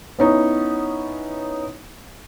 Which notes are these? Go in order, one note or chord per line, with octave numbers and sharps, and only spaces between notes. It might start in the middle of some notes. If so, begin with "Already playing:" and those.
B3 C#4 D#4 E4